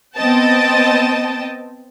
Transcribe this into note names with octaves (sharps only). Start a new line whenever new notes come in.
B3 C4 D#5 G5 A5